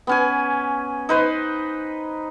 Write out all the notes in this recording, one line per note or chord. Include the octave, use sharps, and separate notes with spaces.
B3 C#4 G#5
D#4 B4 C5